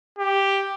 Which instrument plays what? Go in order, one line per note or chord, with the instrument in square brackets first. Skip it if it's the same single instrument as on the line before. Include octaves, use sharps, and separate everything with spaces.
[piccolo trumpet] G4